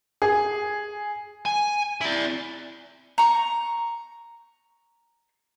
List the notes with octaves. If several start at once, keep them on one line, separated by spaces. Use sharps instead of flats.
G#4
G#5
E4 D5
A#5 C#6